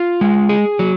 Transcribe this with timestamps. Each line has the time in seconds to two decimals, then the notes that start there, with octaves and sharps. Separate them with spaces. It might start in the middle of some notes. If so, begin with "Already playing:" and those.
Already playing: F4
0.21 G#3
0.49 G#4
0.79 F#3